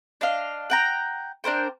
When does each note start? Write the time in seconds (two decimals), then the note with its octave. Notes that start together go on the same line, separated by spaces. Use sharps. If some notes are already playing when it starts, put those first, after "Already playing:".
0.21 D4 D#5 F5
0.70 F#5 G5 A#5
1.44 D4 A#4 C5 G5